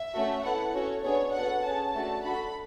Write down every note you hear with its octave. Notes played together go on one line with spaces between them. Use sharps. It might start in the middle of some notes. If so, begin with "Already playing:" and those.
Already playing: E5
A3 C#4 F#4 A4
B3 E4 A4 F#5
C#4 F#4 A4 C#5
B3 D4 G#4 C#5
B3 F#4 A4 F#5
C#4 G#4 A5
A3 D4 F#4 A5
D4 F#4 A4 B5